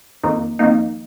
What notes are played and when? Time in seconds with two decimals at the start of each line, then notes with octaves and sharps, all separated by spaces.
0.23 F2 D#3 A#3 D#4
0.59 F2 D#3 A#3 D#4